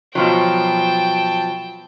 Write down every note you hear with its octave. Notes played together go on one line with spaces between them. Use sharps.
B2 F3 F#3 G5 A5